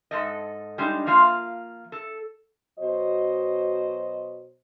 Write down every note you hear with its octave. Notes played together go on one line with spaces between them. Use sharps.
G#2 A4 D#5
G3 G#3 D4 D#4
F3 A#3 F4 F5
A4
B2 F#3 C5 D#5